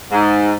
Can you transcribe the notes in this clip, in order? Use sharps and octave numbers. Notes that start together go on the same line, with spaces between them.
G#2